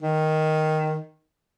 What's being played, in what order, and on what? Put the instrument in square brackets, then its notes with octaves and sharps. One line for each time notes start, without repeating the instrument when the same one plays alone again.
[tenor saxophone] D#3